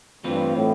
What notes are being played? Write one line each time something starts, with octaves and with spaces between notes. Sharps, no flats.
G2 E3 A3 C4 F4 B4
A2